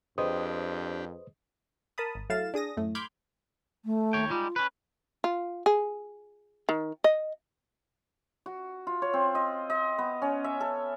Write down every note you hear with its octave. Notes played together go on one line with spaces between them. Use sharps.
F2 D4 G4 G#4 B4 C5 D#5 D#6
A#4 A5 B5 D#6
G#1
F#3 A3 E4 F5 A6 E7
D4 G#4 D#6 A#6
F#2 A2 A3
B5 C6 D6 F6 G6 G#6
A3
D#2 C#5 G5
G3 G#3 D#4 F4
C#4 B4
F4
G#4
D#3
D#5
F#4
F4
C#5
C4
D#5
D#5
B3
C#4
E5
A4